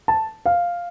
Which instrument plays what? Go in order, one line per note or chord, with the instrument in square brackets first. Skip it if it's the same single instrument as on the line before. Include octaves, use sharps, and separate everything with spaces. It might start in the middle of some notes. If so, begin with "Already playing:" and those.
[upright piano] A5
F5